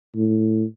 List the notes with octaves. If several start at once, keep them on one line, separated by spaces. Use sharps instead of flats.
A2